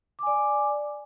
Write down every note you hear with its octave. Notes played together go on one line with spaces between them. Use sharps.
D5 G#5 D6